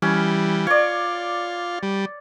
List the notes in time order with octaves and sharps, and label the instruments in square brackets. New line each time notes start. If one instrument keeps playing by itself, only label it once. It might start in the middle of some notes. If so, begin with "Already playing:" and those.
[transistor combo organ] E3 G3 [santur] C#4
[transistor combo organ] F4 [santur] C#5 D5
[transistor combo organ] G3